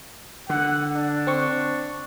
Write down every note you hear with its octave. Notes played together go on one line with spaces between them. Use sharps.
D3 F#5
D4
C4 C#6